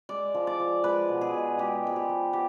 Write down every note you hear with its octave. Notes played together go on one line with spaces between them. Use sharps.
G#3 D5
F3
D5
F3
G#3 B4
B2
G#4
B2
G#3 G4
F3 G#4
G4
F3
B3 G4